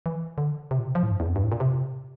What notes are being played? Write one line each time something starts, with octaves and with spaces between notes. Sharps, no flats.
E3
D3
C3
A#2
C3
F3
A2
G2
E2
F2
G2
A2
A#2
C3